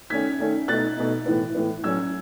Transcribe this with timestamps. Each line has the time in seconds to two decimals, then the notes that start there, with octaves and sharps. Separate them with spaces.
0.10 D#3 A3 C#4 G#6 B6
0.39 D#3 A3 C#4
0.68 B2 A3 D#4 F#6 A6
0.97 B2 A3 D#4
1.26 A2 E3 B3
1.55 A2 E3 B3
1.84 A2 F#3 C#4 E6 G#6